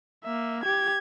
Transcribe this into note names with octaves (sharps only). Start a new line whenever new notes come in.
A#3 E5
G4 G#6